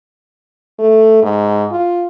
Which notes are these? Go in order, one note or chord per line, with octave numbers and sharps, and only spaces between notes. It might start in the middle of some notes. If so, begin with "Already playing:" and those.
A3
G#2
F4